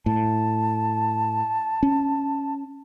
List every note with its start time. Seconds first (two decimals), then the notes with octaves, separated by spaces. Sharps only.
0.06 A2 A5
1.83 C#4